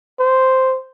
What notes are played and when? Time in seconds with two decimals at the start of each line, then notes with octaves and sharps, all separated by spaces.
0.20 C5